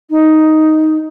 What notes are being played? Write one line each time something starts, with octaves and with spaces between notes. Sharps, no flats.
D#4